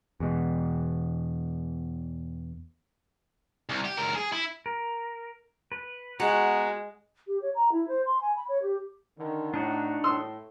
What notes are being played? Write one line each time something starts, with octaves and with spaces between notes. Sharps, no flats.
E2 B2
C2
G4
C#2 A#4
G#4
E4
A#4
B4
G#3 B3 F#4 A#5 F#6
G4
C#5
A#5
E4
C5
C6
G#5
B5
C#5
G4
D3 D#3
A2 D4 D#4 F#4
A2 C6 D#6 E6